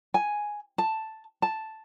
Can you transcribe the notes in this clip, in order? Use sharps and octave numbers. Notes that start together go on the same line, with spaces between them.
G#5
A5
A5